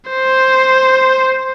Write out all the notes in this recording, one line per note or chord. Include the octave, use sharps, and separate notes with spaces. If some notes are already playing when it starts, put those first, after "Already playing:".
C5